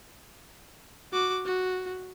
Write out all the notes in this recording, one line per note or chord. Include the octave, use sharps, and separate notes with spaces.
F#4 D6
F#4